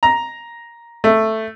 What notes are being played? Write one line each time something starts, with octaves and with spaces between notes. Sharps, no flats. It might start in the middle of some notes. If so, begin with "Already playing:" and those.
A#5
A3